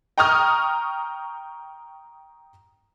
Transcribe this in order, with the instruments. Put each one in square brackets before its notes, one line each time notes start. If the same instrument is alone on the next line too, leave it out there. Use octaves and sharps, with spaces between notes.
[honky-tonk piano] G5 A#5 C#6 D#6 F6